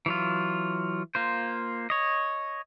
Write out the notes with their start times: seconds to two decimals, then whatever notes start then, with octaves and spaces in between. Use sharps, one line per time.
0.06 E3 F#3 F4
1.15 A#3 F4 C5
1.90 C#5 D#5